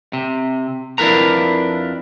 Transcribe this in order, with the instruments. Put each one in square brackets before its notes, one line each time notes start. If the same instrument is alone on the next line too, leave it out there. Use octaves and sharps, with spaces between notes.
[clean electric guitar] C3
F2 D4 E4 A#4 B4 A#5